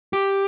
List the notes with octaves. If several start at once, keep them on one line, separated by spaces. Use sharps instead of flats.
G4